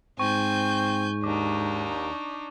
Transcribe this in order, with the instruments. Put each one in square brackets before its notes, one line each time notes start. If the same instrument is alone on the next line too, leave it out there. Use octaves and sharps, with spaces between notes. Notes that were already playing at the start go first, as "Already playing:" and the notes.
[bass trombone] G#2 [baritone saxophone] C4 [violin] G#5 G6 [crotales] C#6
[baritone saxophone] D#2 [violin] D4 D#4 [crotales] D6